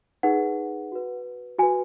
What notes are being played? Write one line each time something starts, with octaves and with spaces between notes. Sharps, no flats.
D#4 G#4 B4 F#5
F#4 B4
F#4 B4 G#5